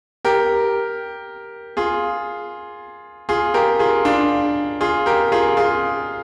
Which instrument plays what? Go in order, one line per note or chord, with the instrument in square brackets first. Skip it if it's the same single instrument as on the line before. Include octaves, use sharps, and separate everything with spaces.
[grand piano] G4 A#4
F4 G#4
F4 G#4
G4 A#4
F4 G#4
D4 F4
F4 G#4
G4 A#4
F4 G#4
F4 G#4